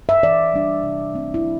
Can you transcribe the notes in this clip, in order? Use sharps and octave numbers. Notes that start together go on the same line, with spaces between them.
E5
E3 D5
G3 D4
C3
A3 C4
E4
E3